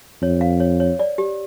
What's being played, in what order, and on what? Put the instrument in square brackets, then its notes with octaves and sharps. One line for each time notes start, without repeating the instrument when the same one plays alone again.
[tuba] F2 [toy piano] C#5
[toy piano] F5
C#5
C#5
D5
G4